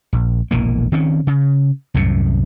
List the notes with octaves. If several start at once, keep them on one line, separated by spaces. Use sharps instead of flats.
A#1
E1 A#1 E3 A#3
D#3 C4 C#4
C#3
C2 F#2 A2 C3